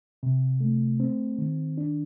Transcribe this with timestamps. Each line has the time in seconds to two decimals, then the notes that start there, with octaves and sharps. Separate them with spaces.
0.23 C3
0.60 A3
1.00 C4
1.38 D#3
1.78 D4